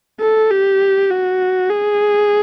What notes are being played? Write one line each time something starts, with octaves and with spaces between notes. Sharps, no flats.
A4
G4
F#4
G#4